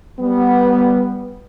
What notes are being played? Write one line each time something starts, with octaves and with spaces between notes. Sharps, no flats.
G3 B3